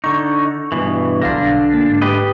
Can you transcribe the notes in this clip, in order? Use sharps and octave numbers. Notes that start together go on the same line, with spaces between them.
D3 D#4 C#6
G2 B2 E3
B1 D3 D4 F5 A#6
A#3
G#2
G4 B4 D#5